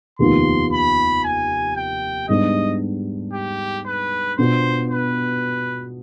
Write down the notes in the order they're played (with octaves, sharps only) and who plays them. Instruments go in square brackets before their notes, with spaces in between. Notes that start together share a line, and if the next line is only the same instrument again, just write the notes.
[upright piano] F1 D#2 D#3 B3 F4 [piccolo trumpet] C6
[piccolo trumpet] B5
G#5
G5
[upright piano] G#2 G3 B3 D4 [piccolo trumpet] D#5
[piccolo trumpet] G4
B4
[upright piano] B2 B3 D4 F4 [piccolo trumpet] C5
[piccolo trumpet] B4